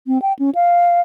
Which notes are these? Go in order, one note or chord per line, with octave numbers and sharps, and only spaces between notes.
C4
G5
C#4
F5